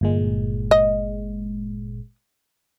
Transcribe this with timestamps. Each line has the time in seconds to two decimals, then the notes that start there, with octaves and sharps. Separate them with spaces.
0.01 G1 A#2 G#3
0.71 D#5